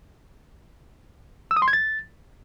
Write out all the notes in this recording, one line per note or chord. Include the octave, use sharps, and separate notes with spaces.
E6
D#6
C6
G#6
A6